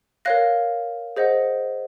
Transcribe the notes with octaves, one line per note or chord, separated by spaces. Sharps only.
A#4 C#5 F5 F#6 A#6
G#4 C5 D#5 F#5